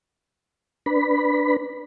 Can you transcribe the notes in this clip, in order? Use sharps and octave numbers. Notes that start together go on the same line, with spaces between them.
D4 B4 B5